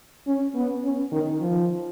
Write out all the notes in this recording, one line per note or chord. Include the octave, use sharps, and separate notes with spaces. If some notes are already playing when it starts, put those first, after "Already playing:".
C#4
B3
C#4
D#3
F3